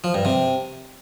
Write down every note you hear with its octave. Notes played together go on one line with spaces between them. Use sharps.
F3
G2
C3